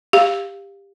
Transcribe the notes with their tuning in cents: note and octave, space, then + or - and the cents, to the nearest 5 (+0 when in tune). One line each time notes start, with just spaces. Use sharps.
G4 +15 F5 +0